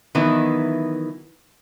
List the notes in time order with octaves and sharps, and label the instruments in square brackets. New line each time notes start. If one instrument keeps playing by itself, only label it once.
[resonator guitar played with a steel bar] D#3 E3 F#3 B3 E4